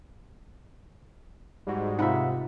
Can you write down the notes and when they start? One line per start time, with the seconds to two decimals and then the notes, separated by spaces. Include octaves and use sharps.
1.67 G#2 G3 F#4
1.99 C3 D#4 F4 E5 F#5 B5